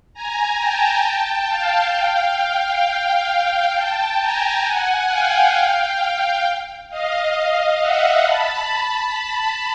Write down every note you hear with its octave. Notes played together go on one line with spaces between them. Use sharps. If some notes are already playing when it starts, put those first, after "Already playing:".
G#5 A#5
G5 A5
F5 G5
F5 G5
G5 A5
G#5 A#5
F#5 G#5
F5 G5
D#5 F5
E5 F#5
A5 B5
A5 B5